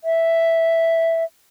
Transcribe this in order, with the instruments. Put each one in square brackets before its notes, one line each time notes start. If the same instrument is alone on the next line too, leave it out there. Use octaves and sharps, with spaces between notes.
[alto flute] E5